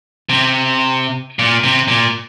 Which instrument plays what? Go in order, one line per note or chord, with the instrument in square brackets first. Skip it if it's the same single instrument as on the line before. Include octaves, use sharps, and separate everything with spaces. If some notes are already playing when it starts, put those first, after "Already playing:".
[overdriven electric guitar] C3
A#2
C3
A#2